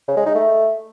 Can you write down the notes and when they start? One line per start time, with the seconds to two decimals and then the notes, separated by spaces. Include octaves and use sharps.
0.08 C#3
0.17 G#3
0.26 D#4
0.35 A3